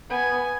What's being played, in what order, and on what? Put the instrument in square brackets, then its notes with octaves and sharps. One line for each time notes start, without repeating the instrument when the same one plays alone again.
[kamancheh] B3 [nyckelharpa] G#5